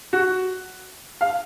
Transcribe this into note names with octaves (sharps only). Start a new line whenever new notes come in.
F#4
F5